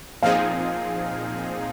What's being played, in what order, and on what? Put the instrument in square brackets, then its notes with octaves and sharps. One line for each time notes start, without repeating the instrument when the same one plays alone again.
[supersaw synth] A#2 F3 C4 D#4 G#4 [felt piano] F5